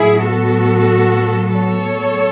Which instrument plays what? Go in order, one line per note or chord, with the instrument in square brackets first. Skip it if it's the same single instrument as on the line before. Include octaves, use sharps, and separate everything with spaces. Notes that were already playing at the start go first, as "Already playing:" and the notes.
Already playing: [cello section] A2 F#3 B3 E4 G#4
F#4 A4
A4 C#5